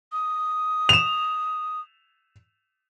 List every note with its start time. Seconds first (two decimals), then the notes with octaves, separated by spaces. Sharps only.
0.12 D#6
0.89 E7 F7